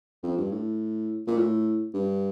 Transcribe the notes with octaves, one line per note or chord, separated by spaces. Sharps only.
F2
G2
A2
A#2
A2
G2